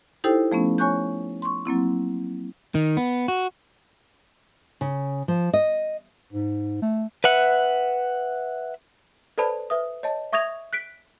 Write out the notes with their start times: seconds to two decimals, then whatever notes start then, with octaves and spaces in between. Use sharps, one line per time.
0.24 D#4 E4 G4 A4 C5 G5
0.52 F3 A3 B3 C#4
0.78 C#5 G#5 C#6 F#6 G6
1.42 C6 C#6
1.65 F#3 A#3 C4 E4
2.75 D#3
2.97 B3
3.28 F#4
4.81 C#3
5.28 F3
5.53 D#5
6.33 G#2
6.82 A3
7.24 B4 E5 F#5
9.38 A4 B4 C5 D5 A5 B5
9.70 B4 E5 D#6
10.03 C#5 D#5 A5
10.33 E5 C#6 D#6 G#6 A#6 F7
10.73 F#6 B6 D7